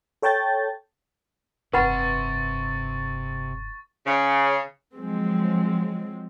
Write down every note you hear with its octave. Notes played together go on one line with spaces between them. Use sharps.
A4 C#5 G5 A5 G6 A6
F1 G2 C3 B4 F#5 B5 C#6 A6
C#3
F3 F#3 G#3 C4